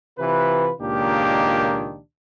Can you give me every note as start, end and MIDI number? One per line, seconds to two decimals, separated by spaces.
0.18 0.71 48
0.18 0.71 52
0.18 0.71 65
0.18 0.71 71
0.81 1.99 37
0.81 1.99 46
0.81 1.99 51
0.81 1.99 58
0.81 1.99 62
0.81 1.99 67